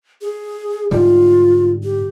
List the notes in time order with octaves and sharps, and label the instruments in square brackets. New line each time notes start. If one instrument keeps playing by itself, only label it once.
[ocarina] G#4
[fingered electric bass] G#2 D3 G3 [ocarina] F4
[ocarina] G4